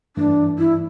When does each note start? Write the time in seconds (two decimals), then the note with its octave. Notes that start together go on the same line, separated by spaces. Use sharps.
0.17 G2 E3 A3 D4
0.58 E4